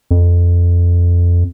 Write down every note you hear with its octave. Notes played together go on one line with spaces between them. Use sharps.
F2